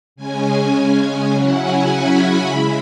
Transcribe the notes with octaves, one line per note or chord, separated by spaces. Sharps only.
C#3 G#3 C#4 G#5
G#5
C#3 F#3 C#4 E4 F#5
G#5
B5
C#3 G#3 E4